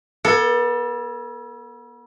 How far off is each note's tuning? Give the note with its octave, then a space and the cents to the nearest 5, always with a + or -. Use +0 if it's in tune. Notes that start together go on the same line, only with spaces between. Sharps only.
B3 -40 A4 +20